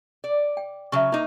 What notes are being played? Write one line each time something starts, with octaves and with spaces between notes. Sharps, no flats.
D5
G5
C#3 F#3 E5 C#6
A#3 D#4 E4